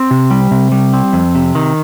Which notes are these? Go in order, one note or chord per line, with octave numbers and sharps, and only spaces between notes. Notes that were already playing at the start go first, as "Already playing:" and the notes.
Already playing: C4
C3
G3
C3
G3
C4
F2
C3
D#3